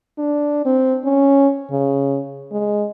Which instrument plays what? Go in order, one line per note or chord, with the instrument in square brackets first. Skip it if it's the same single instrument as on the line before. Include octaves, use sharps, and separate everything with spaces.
[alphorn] D4
C4
C#4
C#3
G#3